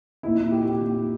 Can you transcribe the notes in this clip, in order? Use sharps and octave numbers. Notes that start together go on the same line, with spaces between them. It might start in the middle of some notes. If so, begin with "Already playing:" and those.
A#2 A#3 D#4 E4
E4
G4
G4
A#2 A#3 D#4